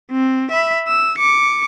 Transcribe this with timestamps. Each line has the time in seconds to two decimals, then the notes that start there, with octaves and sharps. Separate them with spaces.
0.12 C4
0.51 E5 B5
0.88 E6
1.18 D6 C#7